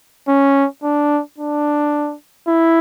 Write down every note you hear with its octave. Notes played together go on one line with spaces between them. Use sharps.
C#4
D4
D4
E4